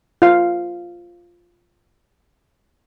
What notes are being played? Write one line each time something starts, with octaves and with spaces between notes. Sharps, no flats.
F4 F5